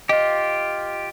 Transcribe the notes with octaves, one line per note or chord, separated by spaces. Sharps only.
F4 G4 D#5